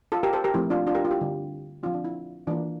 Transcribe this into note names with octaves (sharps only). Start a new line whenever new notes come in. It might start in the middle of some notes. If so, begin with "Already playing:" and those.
F4 A4
G4 A#4
A4 C5
G4 A#4
F3 A3 C4 E4
D4 F4
D4 F4
G4 A#4
F4
E4 G4
D3 G3 C4
F3 C4 D4 F4
D4
E4
E3 A#3 D4 F4